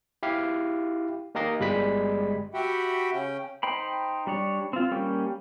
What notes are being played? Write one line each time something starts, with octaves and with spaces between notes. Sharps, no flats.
E4 G4 F5
A#3 D#4 G4 A#4 D#5 F5
G1 G3 G#3 B5 B6
F#4 G4 E5 F#5 G5 B5
C#3 C#4 G5
D#4 C5 G5 B5
G3 D4 C#5
C4 F4
G3 A#3 C#4 G4